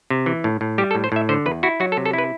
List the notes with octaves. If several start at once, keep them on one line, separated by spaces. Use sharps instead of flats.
C3
E3
A2
A2
G3 G4
A4
A2
C5
A2 E5
D3 C5
E2 B4
E4 F#4
F#3 F#4
A4
C3
A4
E4 B4